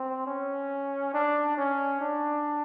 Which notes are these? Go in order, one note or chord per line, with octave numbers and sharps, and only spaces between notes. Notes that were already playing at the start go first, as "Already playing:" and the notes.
Already playing: C4
C#4
D4
C#4
D4